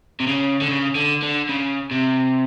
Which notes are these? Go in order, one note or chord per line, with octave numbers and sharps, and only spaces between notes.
C3
C#3
D3
C#3
D3
D3
C#3
C3